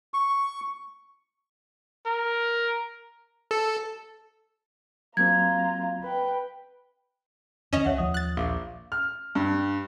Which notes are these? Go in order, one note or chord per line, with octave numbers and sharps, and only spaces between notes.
C#6
A#4
A4
F#3 A#3 C4 F4 A#5 G#6
B4 G5
F2 D#3 C#4 D#5 E7 F7
C2 C#5 E5 F#5
D#2 F3 A#3 D#6
F#6 A6
A#1 E5 F5 D6
F6
G2